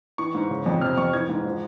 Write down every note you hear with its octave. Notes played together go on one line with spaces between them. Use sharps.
E3 C#6
G#2
C#3
F2
C3 F6
F2 C#6
E3 G#6
G#2
F3